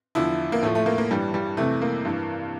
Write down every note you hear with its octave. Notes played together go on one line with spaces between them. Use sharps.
E2 D3 F3 E4
A#3
A2 F3 A3
A3
A#3
A#3
G2 E3 G3
G3
F2 C3 E3 A3
A#3
G2 E3